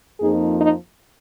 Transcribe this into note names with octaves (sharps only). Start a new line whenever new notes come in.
F2 F3 A#3 D#4 G#4
D#4